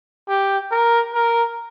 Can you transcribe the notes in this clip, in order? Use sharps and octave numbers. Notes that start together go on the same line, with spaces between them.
G4
A#4
A#4